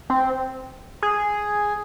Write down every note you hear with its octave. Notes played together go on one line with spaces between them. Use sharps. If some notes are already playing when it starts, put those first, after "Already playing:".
C4
G#4